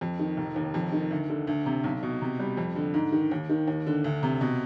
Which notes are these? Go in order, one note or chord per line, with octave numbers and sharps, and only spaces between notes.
F2
D#3
F1
D#2
F2
D#3
D2
D3
D2
C3
B1
B2
C3
G3
F2
D3
G#2
D#3
D#2
D#3
D#2
D3
D2
C3
B2